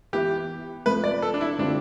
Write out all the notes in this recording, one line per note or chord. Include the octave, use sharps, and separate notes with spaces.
E3 B3 E4 G4
C3 F3 A3 B4
D5
A4
D4
E4
D3 G3 C4 D4 F4